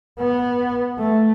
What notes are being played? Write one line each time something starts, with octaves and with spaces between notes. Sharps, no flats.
B3
A3